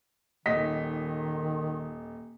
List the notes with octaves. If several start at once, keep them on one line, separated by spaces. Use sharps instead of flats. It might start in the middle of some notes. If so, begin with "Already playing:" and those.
D#1 D#3 D#5 B6